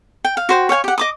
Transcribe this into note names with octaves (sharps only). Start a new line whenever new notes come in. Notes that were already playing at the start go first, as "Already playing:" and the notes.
G5
F5
F#4 C5 G5
C#5 F5 G5 G#5
G4 F#5
D#5 D6 D#6